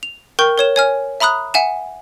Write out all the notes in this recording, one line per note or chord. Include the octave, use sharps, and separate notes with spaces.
F7
A#4 G5 C#6 G6
A#4 C#5 E7
C#5 G#5 F6
E5 A#5 B5 D#6 F#6
E5 F#5 G#5 E7